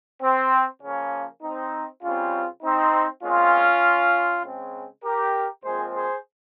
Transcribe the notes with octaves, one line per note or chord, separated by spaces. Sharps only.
C4
C#3 F3 A#3 C#4
C4 D#4
C#3 G3 C4 C#4 F4
C4 D#4
A#2 G#3 C4 C#4 F4
C#3 G#3 C4
G4 A#4
A#2 F3 G#3 C4 G#4 C5
G#4 C5